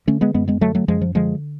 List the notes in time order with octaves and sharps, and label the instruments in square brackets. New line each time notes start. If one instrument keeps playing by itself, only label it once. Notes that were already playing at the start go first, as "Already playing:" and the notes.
[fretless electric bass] D3 A3 C#4
G#3 B3
F#2 G#3 B3
G#3 B3
D3 F#3 A3
F#3 A3
F#2 F3 G#3
F3
D3 F3 G#3